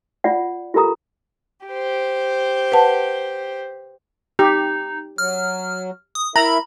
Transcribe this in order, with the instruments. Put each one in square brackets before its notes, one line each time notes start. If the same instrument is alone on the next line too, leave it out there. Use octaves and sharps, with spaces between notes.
[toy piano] F4 D5 F#5
F4 G4 A4 A#4 A#5 D#6
[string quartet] G4 C5
[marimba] B4 F#5 A5
[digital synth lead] D#4 [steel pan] G4
[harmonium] F#3 [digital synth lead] F6
[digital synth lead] D#6
[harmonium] E4 A#4 E5 [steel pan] A#5 [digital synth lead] B5